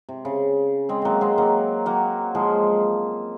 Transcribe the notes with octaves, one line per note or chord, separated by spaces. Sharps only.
C3
C#3
G#3 C4
F#3 A#3 C4
G#3 C4
F#3 A#3
F#3 A#3
F3 G#3